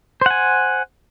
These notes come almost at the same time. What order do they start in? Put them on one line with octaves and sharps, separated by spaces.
C5 F#5 G#5